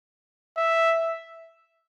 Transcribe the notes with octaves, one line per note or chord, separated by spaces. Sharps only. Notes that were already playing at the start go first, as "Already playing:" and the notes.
E5